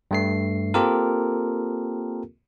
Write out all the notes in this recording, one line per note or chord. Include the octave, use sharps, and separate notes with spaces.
G2 A3 C7
A#3 C4 F4 G4 A4 A#4